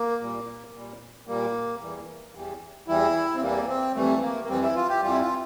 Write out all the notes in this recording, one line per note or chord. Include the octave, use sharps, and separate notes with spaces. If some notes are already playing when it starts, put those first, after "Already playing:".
Already playing: A#3
A#2 G3
A#2 G3
A#2 G3 A#3
E2 E3 G3
E2 E3 G3
E2 E3 G3 E4
C4
E2 E3 G3 A#3
C4
F2 E3 G3 A3
A#3
A#3
F2 E3 G3 C4
E4
F4
G4
F2 E3 G3 F4
E4
F4